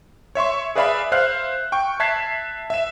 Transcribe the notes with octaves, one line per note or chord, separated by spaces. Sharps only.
C#5 E5 C6 C#6
G#4 B4 D5 E5 F5 B5
C5 E5 F5 F6 F#6
G5 C#6
E5 A5 F#6 G#6 B6 C7
E5 E7